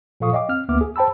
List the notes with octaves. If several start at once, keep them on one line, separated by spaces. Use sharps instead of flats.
A#2 F3 A4 F5 C#6 D#6
C#5 D#5 F5 G5 D6
C4 F6
D2 A#3 B3 E5 D6 F6
G#4
C5 G5 A5 B5 E6